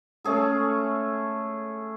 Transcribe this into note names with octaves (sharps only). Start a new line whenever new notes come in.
A3 C#4 G#4 A4